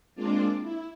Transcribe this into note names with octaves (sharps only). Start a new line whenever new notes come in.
G#3 A#3 C4 D4 F4 D5
E4